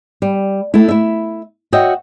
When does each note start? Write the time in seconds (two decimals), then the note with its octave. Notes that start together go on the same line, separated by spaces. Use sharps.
0.22 G3
0.74 A3 E4
0.88 E4 E5
1.73 F#4 C#5 D#5 E5 G5